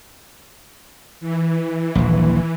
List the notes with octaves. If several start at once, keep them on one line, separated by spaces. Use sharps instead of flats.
E3
D#1 A#1 E3